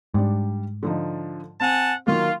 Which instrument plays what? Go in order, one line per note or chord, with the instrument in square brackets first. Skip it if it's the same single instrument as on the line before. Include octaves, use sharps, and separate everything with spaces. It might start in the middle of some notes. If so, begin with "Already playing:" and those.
[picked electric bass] G#2 [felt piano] G3 D4
[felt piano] D3 F3 D#4
[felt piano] C4 [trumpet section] F#5 G#5 A5
[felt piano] D#3 F#3 A#3 [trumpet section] F4